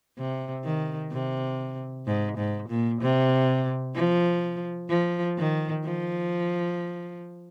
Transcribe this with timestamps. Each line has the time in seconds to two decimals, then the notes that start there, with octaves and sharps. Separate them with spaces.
0.18 C3
0.64 D#3
1.12 C3
2.06 G#2
2.37 G#2
2.69 A#2
3.01 C3
3.95 F3
4.89 F3
5.37 D#3
5.84 F3